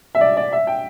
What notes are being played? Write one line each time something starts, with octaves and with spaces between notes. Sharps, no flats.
E5
D5
D5
E5
G5